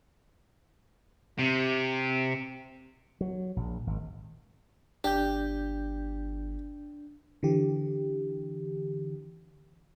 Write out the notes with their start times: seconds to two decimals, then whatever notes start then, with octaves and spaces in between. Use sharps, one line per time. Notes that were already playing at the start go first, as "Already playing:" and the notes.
1.38 C3
3.21 F#3
3.56 A#1
3.87 G#1
5.04 G1 D4 G4 G6
7.43 D3 E3 G4